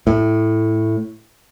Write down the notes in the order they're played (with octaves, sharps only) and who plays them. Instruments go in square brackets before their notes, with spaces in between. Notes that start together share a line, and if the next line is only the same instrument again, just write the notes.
[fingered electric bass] A2